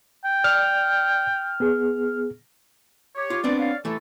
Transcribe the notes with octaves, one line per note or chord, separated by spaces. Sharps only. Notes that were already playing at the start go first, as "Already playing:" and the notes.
G5
D5 F6
B3 G#4
G4 C#5
F4
B3 C4 D4 D5
C#5 D5 F5
E3 A3 E4 A4